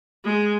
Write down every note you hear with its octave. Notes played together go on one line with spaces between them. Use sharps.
G#3